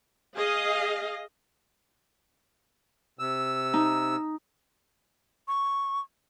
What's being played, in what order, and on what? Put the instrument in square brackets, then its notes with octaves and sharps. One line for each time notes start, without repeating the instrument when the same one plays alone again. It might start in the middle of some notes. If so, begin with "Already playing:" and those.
[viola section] G#4 D#5 F5
[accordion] C3 E6
[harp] D#4
[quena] C#6